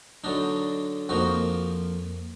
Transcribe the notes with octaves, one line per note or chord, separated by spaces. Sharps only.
D3 F#3 D4 D#4
F2 F3 A#3 D#4 F#4